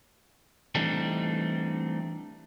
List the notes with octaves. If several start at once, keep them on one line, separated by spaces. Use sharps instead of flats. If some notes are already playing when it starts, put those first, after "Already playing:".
E3 G3 A3 C4 D4 D#4